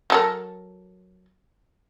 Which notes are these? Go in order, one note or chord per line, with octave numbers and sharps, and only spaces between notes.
F#3 A4 A#4